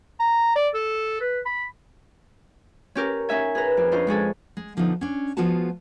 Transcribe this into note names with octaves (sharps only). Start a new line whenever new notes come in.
A#5
D5
A4
B4
B5
C#4 G4 A#4
C#4 D#4 E5 G#5
G#4 B4 A#5
F2
C#4 D4 F4 C5 D#5
G#3 C#4 G#4 A4
G#3
D3 F3 B3 D4 D#4
C#4 D4
F3 G#3 B3 F4 F#4 A5